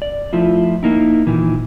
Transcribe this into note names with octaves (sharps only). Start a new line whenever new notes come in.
D5
F3 A3 E4 F4
A#3 D#4 E4
A#2 D#3 E3